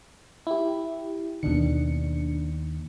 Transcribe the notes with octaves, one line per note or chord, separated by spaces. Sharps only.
E4 G4
D#2 B2 D#3 D4 C#7